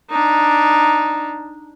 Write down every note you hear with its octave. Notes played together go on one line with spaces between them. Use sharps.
D4 D#4